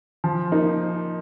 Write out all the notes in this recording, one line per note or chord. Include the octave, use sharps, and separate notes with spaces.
F3
A#3 D#4